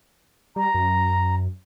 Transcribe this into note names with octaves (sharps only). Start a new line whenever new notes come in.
G3 A#5
F#2